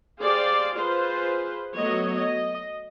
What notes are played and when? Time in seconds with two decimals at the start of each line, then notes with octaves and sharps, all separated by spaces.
0.21 G4 G#4 C5 D5 F5
0.77 F4 G#4 B4 C5
1.75 F#3 A3 B3 C#5 D#5
2.16 D#5